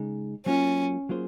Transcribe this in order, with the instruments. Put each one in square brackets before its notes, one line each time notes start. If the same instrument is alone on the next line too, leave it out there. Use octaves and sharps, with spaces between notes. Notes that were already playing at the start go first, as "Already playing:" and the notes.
Already playing: [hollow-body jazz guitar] C#3 G#3 D#4
[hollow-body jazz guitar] F#3 A#3 F4 [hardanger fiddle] C#4
[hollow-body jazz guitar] F#3 A#3 F4 G#4 C5